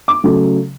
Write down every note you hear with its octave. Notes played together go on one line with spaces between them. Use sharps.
D6
C#3 F#3 A3